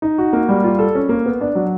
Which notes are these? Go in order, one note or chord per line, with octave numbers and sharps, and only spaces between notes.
D#4
F#4
A#3
G3
F4
A4
C#4
A#3
B3
D4
F#3